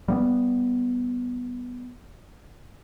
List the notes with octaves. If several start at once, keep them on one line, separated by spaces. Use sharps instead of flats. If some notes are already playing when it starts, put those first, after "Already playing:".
G3 A#3 B3